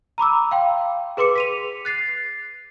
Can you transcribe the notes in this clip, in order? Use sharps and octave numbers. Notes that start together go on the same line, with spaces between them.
A#5 B5 D6 E6
F5 G5 C6
G#4 B4 C6 D6 C#7
B6 D#7 F7
F#6 A6 C7